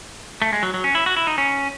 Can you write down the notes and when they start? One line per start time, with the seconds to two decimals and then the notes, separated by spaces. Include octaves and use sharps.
0.42 A3
0.53 G#3
0.63 F#3
0.74 F#3
0.84 C#4
0.95 E4
1.06 F#4
1.17 E4
1.27 D#4
1.38 C#4